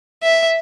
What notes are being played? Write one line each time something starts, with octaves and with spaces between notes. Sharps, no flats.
E5